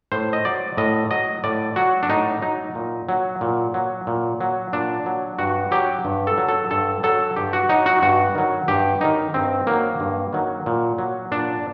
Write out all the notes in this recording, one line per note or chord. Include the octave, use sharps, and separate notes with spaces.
A2 C5
D#5
F#3 D5
A2 D#5
F#3 D#5
A2 D5
F#3 F#4
D4
A2 D#4
F#3 D#4
A#2
F#3
A#2
F#3
A#2
F#3
A#2 D4
F#3
G2 F#4
F#3 G4
G2
A4
F#3
A4
G2 A4
F#3 A4
G2 G4
F#4
F#3 D#4
F#4
G2 F#4
D#3 F#3
G2 G4
D#3 F#3 D#4
G2 C4
D#3 F#3 A#3
G2
D#3 F#3
A#2
F#3
A#2 D4